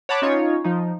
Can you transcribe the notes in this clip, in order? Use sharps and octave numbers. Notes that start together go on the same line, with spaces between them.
C#5 F#5 A5 B5 D6
C#4 D#4 F4 C#5
F3 D#4